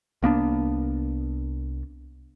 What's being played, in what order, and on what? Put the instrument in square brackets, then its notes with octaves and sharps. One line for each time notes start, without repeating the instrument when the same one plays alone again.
[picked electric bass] C2 A#3 B3 D4